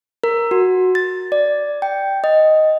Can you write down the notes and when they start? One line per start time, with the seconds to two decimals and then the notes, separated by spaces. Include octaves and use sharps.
0.24 A#4
0.51 F#4
0.95 A6
1.32 D5
1.82 G5
2.24 D#5